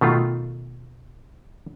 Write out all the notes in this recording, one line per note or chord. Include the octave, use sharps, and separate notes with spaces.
B2 D#3 A3 F4